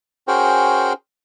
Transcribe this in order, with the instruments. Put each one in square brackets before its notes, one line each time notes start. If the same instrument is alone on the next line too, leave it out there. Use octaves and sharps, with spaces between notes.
[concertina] C#4 F#4 G#4 A#4 C5 G5